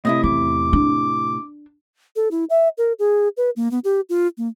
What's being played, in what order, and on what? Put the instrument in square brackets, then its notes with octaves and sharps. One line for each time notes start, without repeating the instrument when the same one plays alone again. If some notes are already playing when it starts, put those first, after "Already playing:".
[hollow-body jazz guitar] A2 C3 E4 [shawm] D#5
[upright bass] E2 [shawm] D6
[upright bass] D4
[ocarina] A4
E4
E5
A#4
G#4
B4
A#3
B3
G4
F4
A#3